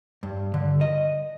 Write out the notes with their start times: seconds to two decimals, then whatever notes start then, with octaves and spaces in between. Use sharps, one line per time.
0.23 G2
0.54 D3
0.81 D#5